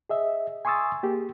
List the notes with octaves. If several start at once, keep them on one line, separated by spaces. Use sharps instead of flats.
G#4 D#5 E5
G#5 C6 C#6 D#6 E6 A6
A#3 G4 G#4